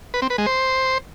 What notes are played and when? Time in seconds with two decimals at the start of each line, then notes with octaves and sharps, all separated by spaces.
0.14 B4
0.22 C4
0.30 B4
0.38 G#3
0.46 C5